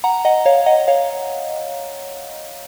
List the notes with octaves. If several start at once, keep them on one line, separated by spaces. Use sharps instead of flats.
F#5 A#5
D#5 F#5
C#5 F5
D#5 F#5
C#5 F5